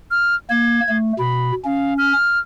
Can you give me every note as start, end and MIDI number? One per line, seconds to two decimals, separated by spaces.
0.11 0.35 89
0.50 0.80 58
0.50 0.97 92
0.89 1.13 57
1.19 1.52 47
1.19 1.55 83
1.64 2.13 61
1.64 1.94 77
1.98 2.39 89